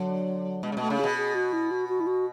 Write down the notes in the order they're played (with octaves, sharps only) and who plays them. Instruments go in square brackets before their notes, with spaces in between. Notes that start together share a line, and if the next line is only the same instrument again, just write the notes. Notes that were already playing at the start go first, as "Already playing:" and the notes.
Already playing: [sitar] D3 [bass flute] F#3
[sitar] B2 [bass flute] G#3
[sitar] C#3
[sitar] B2 [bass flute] A3
[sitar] C#3
[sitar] B2 [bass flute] G#4
[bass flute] G#4
F#4
E4
F#4
F#4
E4
F#4